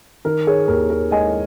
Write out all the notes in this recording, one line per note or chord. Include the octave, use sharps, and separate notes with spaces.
D#3 A#4
G#4 C#5
D#2 A#4
A#4
G#3 D#5 G#5